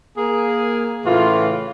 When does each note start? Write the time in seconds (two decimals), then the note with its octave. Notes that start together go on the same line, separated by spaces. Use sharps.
0.17 A#3 G#4
1.05 A2 C#3 E3 F4